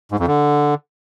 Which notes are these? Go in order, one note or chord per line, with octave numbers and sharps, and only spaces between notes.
G#2
F2
D3